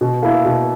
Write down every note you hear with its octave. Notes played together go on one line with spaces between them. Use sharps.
B2
A#3 E4
B2